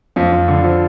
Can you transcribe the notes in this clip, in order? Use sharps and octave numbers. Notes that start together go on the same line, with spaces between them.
F2 F4
F2
D3
F3